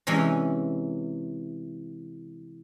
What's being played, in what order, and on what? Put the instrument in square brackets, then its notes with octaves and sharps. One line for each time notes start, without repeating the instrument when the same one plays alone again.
[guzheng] C3 E3 G#3 C#4